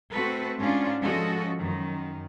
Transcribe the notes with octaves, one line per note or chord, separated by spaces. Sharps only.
A3 C4 F#4 A4 B4
G#2 C#4 D4 F4
F3 G#3 C#4 F#4 A4 D#5
F#2 D#3